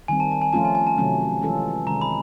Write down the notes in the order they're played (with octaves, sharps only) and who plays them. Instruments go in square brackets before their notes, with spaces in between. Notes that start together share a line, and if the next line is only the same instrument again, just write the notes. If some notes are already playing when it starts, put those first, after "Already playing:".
[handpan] D#3 G3 C4 [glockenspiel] G#5
[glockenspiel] A5
A5
G#5
[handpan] F3 A3 C#4 F4 [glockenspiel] A5
[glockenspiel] G#5
G#5
A5
[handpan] C3 D#3 F#3 A3 C#4
E3 G#3 C#4 F4 A4
[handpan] C3 D#3 G#3 C#4 [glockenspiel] A#5
[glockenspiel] B5